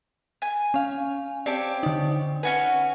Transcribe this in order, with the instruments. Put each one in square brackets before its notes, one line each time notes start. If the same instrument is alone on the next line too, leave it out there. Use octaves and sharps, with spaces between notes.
[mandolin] G#5
[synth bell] C#4 F5
[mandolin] C4 G4 C#5 [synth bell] D5 A5
[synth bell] D3 D#4
[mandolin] C#4 F#4 G#5 [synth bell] B4